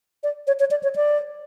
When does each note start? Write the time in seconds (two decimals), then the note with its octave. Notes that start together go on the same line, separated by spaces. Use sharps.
0.23 D5
0.47 C#5
0.60 C#5
0.71 D5
0.83 C#5
0.96 D5